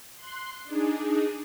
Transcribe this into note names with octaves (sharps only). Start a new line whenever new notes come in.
C6 F#6
D4 D#4 G#4